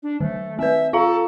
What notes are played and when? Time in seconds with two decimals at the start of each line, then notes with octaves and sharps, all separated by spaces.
0.03 D4
0.20 D#3 A3
0.59 C4 B4 E5
0.93 F4 A4 F5 A#5